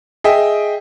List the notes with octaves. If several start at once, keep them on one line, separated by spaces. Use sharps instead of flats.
G#4 D#5 E5 G5